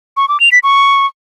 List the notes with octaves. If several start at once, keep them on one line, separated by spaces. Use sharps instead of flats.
C#6
D6
F7
B6
C#6